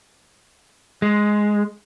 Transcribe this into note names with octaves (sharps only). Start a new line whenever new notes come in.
G#3